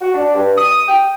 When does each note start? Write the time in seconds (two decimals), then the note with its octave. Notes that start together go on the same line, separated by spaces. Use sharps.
0.01 F#4
0.14 D4
0.35 G2
0.57 D#6
0.88 G5